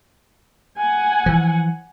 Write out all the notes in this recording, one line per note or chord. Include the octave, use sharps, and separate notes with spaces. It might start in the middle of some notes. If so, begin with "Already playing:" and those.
F#5 G#5
E3 F3